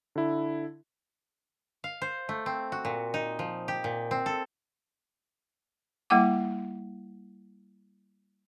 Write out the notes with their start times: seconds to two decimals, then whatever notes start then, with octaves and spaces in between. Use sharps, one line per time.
0.16 D3 E4
1.84 F5
2.02 C5
2.29 A3
2.46 C4
2.72 F#4
2.85 A#2
3.14 D#4
3.39 F3
3.68 G4
3.84 A#2
4.11 C4
4.26 A4
6.10 G3 A#3 E4 F#5 D6